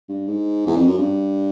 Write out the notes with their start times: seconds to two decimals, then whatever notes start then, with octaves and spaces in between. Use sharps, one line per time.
0.09 G2
0.28 G#2
0.67 E2
0.77 F2
0.88 F#2
0.98 G2